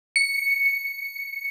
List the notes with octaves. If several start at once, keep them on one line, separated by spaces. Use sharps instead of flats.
C#7